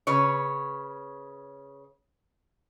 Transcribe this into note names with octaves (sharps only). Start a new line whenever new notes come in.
C#3 B4 C#5